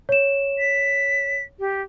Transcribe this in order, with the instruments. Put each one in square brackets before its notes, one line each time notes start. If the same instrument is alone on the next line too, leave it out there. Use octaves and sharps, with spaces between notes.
[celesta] C#5 E7
[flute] B6
G4